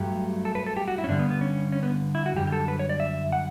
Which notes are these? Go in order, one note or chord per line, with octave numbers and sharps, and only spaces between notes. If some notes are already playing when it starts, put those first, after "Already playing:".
Already playing: G2 F#3 A3 G4
A4
B4
A4
G4
F#4
E4
C#4
G2 D3 G3 D4
B3
B3
C#4
C#4
B3
E4
F#4
F#2 D3 G3 G4
G4
A4
B4
C#5
D5
E5
F#5